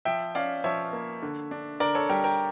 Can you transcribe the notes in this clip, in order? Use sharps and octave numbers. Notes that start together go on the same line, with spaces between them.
F3 E5 G5
C#4 D5 F5
F3 C#5 E5
A#3
D3
D4
D3 A#4 D5
A4 C#5
G3 G4 A#4
G4 A#4